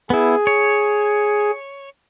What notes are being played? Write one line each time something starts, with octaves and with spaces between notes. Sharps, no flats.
B3 E4 G#4
C#5